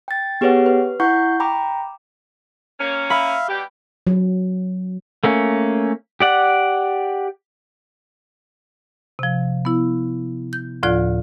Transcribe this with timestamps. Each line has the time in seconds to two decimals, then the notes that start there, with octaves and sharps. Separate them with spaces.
0.08 G5 A6
0.41 B3 G4 G#4 B4 C#5 F#5
0.66 B4
1.00 E4 F#5 C#6 G6
1.40 G5 A#5 B5 D6
2.80 A#3 C#4
3.10 E5 F5 B5
3.48 B2 G3 G4
4.07 F#3
5.24 A3 A#3 C#4
6.20 G4 D5 F#5
9.19 C3 F3
9.65 B3 E4
10.53 G6
10.83 D2 A2 F3 F4 D5 F#6